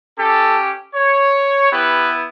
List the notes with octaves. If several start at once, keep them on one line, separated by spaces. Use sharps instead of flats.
C#4 G4 A4
C#5
B3 E4 G4 B4